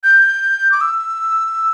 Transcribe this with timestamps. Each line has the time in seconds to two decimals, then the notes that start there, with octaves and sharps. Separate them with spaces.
0.04 G6
0.72 D6
0.81 E6